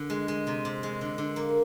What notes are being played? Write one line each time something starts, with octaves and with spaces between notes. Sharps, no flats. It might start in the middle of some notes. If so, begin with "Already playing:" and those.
Already playing: D3
G#3
G#3
C3
C3
G#3
D3
D3
A#3